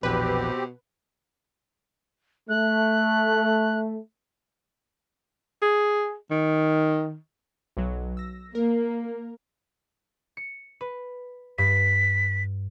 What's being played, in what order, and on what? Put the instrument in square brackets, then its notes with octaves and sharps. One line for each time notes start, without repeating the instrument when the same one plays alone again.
[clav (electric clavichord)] A#1 E2 [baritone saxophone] B2 [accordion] C4 G4 [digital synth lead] B4
[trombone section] A3 [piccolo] F#6
[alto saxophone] G#4
D#3
[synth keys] B1 F#3
E6 A#6
[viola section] A#3 [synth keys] A#4
[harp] C#7
B4
[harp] G2 [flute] B6